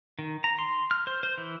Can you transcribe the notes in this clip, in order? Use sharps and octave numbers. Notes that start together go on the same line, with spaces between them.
D#3
A#5
C6
F6
C5
C5
E3